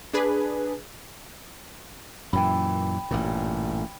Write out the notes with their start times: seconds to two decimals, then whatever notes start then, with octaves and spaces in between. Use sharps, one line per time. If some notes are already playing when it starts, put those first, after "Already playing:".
0.13 D4 G#4 B4
2.33 F#2 A#2 E3 G5 B5
3.11 A1 G2 A#2